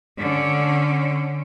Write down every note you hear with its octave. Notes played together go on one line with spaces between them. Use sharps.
D3 C#4